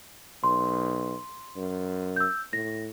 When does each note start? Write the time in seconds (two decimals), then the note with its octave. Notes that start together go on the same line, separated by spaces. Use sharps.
0.44 B1 C6
1.57 F#2
2.16 E6 G6
2.53 A2 A#6